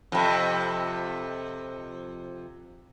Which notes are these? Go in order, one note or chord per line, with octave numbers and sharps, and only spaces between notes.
F2 C3